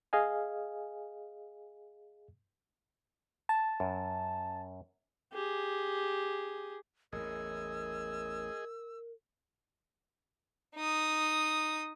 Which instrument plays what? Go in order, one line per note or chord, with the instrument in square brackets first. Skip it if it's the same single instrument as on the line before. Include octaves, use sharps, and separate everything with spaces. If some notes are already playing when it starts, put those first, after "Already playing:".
[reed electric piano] G#4 D#5 F5 G#5
[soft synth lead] A5
[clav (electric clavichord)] F#2
[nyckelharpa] G4 G#4
[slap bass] A1 E2 [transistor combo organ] G#4 D#5 [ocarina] A#4 [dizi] E6
[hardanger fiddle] D#4 D#6